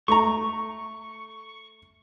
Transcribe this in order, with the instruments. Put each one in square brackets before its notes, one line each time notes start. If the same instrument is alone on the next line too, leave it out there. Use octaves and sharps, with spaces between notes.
[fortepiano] A3 A#5 [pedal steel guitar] C#6